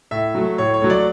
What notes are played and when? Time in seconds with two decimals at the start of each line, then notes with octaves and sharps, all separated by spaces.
0.11 A2 E5
0.35 F#3 A3
0.58 A2 C#5
0.74 C#5
0.82 F#3 A3
0.90 D5